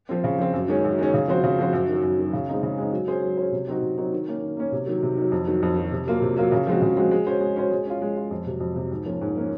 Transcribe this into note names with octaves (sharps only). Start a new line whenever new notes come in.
F3 C4
C#3
F3 C4
F#2
D#3 G#3 C#4
F#2
D#3 G#3 C#4
C#3
F3 C4 F#4 C5
C#3
F3 C4 F#4 C5
F#2
D#3 F#3
F#2
D#3 F#3
C#3
G#3 C4 D#4
C#3
G#3 C4 D#4
F#3
C#4 G#4 C5
F#3
C#4 G#4 C5
C3
F#3 C4 D#4 F#4
C3
F#3 C4 D#4 F#4
D#3
A#3 C#4
D#3
A#3 C#4
C3
D#3 F#3
C3
D#3 F#3
F2
D#3 F#3
F2
D#3 F#3
C3
F#3 A#3 F4
C3
F#3 A#3 F4
C#3
F3 G#3 C4 F#4
C#3
F3 G#3 C4 F#4
G#3
C#4 F#4 C5
G#3
C#4 F#4 C5
G#3
C#4 F4
G#3
C#4 F4
F2
C3 F#3
F2
C3 F#3
G#2
F3 A#3 C#4
G#2
F3 A#3 C#4